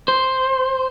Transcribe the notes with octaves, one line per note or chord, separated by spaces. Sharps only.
C5